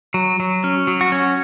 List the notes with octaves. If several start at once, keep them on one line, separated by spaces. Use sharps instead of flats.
F#3
F#3
C#4
F#3
F#4
C#4